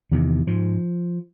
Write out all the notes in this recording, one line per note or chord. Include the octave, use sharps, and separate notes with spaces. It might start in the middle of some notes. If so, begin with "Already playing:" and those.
E2 C3 D#3
G#2 F3